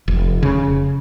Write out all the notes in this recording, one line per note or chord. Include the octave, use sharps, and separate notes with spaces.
F1
C#3